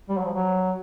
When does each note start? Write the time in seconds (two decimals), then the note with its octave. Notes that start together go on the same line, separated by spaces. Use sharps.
0.09 G3
0.18 F#3
0.25 F3
0.34 F#3